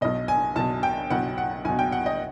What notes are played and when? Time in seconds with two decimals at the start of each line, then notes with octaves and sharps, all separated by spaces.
0.01 B1 B2 D#5
0.28 G#5
0.56 B1 B2 A5
0.83 G5
1.10 B1 B2 F#5
1.38 F#5
1.65 B1 B2 G#5
1.79 G5
1.92 F#5
2.06 D#5